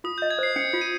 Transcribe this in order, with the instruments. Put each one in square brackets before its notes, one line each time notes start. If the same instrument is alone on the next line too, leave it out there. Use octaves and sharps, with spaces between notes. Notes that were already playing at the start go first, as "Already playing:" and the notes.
[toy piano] F4 [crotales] D#6
[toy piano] D#5 [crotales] G6
[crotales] G#6
[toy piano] C5 [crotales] C7
[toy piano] C#4 [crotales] C#7
[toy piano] F4
[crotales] D#7